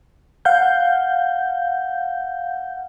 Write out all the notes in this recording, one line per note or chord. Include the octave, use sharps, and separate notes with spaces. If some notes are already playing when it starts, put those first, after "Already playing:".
F5 F#5 G6